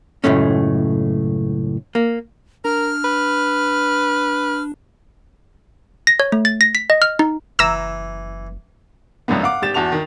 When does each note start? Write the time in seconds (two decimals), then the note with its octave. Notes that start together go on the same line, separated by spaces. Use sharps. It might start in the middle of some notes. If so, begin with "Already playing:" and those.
0.24 C#2 F#2 A2 A3 C#4
1.95 A#3
2.65 D4 A#4 F6
3.04 B4
6.07 A#6
6.20 C#5
6.32 A3
6.45 A6
6.61 A#6
6.75 B6
6.90 D#5
7.02 F6
7.19 D#4
7.59 F#1 E3 A#5 E6
9.28 C#2 F#2 A2 D3 B3
9.43 F5 F#5 D6
9.62 G#1 G4 A6 E7
9.74 E2 F#4 A5 F7
9.92 D#3